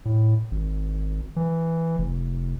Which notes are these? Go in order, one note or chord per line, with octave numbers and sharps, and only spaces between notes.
A2
G#1
E3
F1